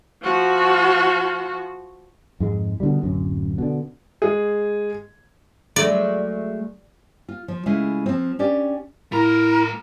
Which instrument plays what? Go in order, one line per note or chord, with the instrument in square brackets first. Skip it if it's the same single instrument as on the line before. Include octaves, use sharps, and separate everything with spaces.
[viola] F3 F#4
[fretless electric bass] F2 G#2 G#3
B2 D3 D#3 G3
D1 F#2
B2 D3
[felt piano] G#3 G#4
[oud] F#3 G#3 A3 [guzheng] D5
[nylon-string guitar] F4
F3
C#3 G#3 A3 E4 F4
F3 C4
C#4 D4 G4 D5
[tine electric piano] A2 F4 [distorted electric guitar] A3 A#5 [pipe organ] E4 [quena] A#4